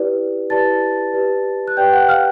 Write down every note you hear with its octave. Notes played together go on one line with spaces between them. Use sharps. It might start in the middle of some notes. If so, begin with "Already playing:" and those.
Already playing: E4 G4 B4 D5
E4 G4 B4 D5 A5 A6
G4 B4 D5
F#6
G4 B4 D5 G5 G6
F#5 F#6
F5 F6